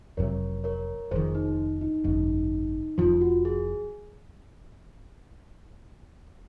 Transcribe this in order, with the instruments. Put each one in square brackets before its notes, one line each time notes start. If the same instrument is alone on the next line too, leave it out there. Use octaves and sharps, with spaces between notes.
[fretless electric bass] F1 F2 C3 F#3 [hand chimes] A#4 C#5
[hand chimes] A#4 C#5
[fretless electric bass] F1 F2 D#3 [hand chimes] G#4 C5
[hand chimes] D#4
D#4
[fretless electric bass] G#1 F#2 C#3 [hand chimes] D#4
[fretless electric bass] F1 F2 C3 F3 [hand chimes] F4
[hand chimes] F#4
G#4